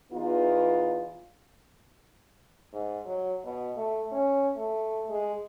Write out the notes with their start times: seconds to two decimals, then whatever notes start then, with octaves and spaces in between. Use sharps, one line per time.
0.11 E2 E3 B3 D#4 F4
2.73 G#2
3.05 F#3
3.43 B2
3.76 A3
4.12 C#4
4.56 A3
5.09 G#3